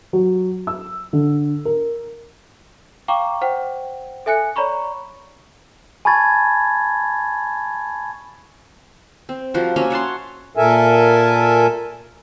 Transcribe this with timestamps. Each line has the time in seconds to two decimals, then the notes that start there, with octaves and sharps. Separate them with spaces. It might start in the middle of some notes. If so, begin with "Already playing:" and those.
0.13 F#3
0.67 E6
1.13 D3
1.65 A#4
3.08 F5 G5 A#5 C#6 D6
3.41 C5 F#5 G5
4.26 A4 E5 G#5 F#6 C#7
4.56 C#5 D5 A#5 B5 C#6
6.05 G#5 A5 B5 C#6 G#6 A6
9.29 C4
9.54 F3 G3 F#4 A#4
9.76 A#3 C#4 F#4 E5
9.90 C#5 F#5 A5 C6
10.57 A#2 A4 A#4 E5 G#5